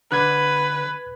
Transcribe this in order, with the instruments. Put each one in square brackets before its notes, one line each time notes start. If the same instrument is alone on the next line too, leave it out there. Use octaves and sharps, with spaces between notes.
[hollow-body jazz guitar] D3 [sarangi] B4 [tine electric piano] F#6 G#6